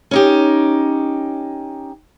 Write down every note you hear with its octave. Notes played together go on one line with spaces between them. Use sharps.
C#4 D#4 G4